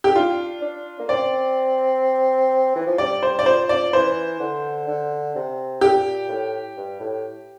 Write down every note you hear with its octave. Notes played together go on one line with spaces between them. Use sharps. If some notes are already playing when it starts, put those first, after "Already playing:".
G4
D4 F4
D4
A#3
C4 D5
E3
F3
G3 D5
C5
D5
F3 C5
D5
E3 C5
D3
D3
C3
A#2 G4
A2
G2
A2